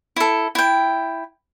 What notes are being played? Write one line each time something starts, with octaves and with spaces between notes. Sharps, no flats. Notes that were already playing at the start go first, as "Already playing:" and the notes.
E4 A4
E4 G5